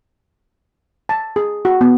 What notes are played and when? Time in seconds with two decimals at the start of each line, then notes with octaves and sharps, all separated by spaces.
1.09 A5
1.36 G#4
1.65 F#4
1.81 B3